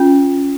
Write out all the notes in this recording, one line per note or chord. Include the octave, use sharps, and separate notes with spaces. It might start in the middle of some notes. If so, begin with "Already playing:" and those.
Already playing: C#4 F4